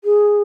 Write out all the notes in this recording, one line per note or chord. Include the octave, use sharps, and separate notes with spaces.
G#4